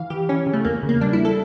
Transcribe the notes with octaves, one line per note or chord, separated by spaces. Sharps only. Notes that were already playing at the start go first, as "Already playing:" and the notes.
Already playing: E3 F5
E3 G4
E3 C#4
C#3
A3
E2 A#3
C#3
A#3
G3 D4
E4
A4